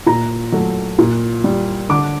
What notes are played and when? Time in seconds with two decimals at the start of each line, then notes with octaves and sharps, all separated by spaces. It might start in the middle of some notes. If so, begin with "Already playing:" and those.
0.06 A#2 A#5
0.52 F#3 A3
0.98 A#2
1.44 G3
1.89 D3 D6